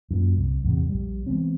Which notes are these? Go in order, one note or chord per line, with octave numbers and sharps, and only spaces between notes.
F#2 A#2
C2
E2 A2 C3
A#1 G3
E3 G#3 B3 C4